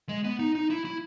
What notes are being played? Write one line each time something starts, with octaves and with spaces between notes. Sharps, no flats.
G#3
B3
D#4
D#4
E4
E4